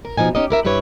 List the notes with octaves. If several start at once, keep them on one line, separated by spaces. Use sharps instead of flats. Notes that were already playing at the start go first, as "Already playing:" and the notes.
A#4
B2 F3 D#4 G#5
C#4 D#4 G4 D#5
E4 A#4 E5
G2 E4 G4 B4 C#5